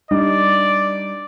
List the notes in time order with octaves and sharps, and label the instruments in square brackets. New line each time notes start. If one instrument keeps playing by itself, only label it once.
[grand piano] G3 D4 D#4 [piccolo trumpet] D5